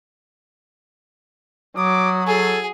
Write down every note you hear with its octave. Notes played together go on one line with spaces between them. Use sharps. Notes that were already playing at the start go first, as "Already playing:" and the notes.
F#3 D6 D#6
G#4 A4 G#5